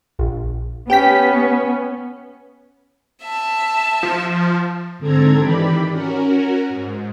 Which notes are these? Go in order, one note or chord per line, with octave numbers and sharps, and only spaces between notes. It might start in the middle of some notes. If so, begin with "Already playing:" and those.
A#1
B3 C#4 G4 G5 B6
E5 A5
F3
G#2 D3 C4 A4 A#5 G#6
D#3 E3 G4 D5 B5
C#4 F#4 A#4
G#2